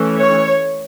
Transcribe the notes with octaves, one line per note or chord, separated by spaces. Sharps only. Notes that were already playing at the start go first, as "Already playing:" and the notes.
Already playing: E3 A3 C#4
C#5